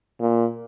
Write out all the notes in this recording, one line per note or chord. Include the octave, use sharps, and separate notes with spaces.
A#2